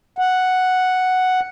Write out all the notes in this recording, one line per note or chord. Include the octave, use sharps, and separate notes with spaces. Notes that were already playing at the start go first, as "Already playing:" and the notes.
F#5